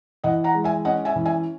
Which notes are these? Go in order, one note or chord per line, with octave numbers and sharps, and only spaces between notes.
E3 D#5 F#5
F#5 A#5
G#3
E5 G#5
C#4 D#5 F#5
E5 G#5
E3
E5 G#5